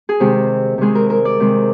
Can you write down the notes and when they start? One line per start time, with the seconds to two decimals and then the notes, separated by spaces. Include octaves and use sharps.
0.09 G#4
0.20 C3 D#3 G#3 C4 G4
0.78 C3 D#3 G#3 C4 G#4
0.95 A#4
1.10 A#4
1.25 D5
1.40 C3 D#3 G#3 C4